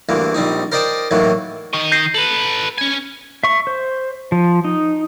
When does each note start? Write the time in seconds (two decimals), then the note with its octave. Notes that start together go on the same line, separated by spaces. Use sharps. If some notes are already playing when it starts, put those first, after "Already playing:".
0.09 D2 G2 E3 A#3
0.34 A#1 G3 C4 D#4
0.72 A#4 C5 D5 D#5 G5 A5
1.11 A2 D#3 E3 F#3 A#3
1.73 D#3 D#5 C#6
1.92 G6 A#6 C7
2.14 A4 B4 F#7
2.78 C#4 G#5
3.43 E5 C#6
3.67 C5
4.32 F3
4.64 D#4